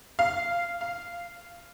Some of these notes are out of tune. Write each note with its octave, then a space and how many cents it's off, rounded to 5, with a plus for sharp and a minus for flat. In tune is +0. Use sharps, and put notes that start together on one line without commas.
F5 -15
F5 -15